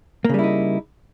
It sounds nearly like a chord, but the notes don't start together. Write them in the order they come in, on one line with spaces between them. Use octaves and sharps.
A#3 C#3 G3 E4 D#4